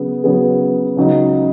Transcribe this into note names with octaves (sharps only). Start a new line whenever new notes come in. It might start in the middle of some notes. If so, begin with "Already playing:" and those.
Already playing: C#3 F#3 B3 G#4
C#3 F#3 B3 G#4 B4
C#2 C#3 F#3 D#4